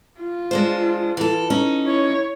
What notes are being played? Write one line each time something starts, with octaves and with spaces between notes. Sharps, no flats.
F4
G#3 D4 C5
E3 A4
C#4 D#4
E4 C#5